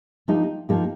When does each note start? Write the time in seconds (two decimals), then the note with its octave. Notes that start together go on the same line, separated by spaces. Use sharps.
0.28 F3 A#3 D#4 G4
0.69 F3 A#3 D#4 G4